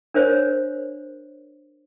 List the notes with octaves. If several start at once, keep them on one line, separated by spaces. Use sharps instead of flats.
D4 A#4 C5 C#5